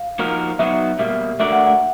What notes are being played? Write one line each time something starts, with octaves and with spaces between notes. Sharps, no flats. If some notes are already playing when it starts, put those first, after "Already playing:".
Already playing: F5
F3 A#3 D#4 F#4 A#4
F#3 B3 D#4 F#4 E5
B2 G3 A#3 E5
A3 D4 F#4 A#4 D5 E5
F#5
F#5